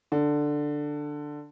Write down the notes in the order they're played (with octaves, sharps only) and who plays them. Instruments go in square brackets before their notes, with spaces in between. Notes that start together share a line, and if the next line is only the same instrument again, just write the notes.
[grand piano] D3